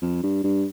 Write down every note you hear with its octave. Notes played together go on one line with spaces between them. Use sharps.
F2
G2
G2